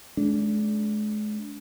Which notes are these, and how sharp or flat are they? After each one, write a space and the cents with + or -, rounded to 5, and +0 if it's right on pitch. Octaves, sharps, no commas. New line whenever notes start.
G#3 +40 D4 -30